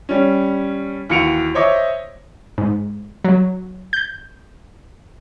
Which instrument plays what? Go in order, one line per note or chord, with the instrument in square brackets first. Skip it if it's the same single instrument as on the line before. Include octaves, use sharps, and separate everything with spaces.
[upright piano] G3 C#4
D#2 E3 F#4 C#7 D7 F7
C5 C#5 D#5 E5 D6
[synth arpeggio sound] G#2
F#3
G6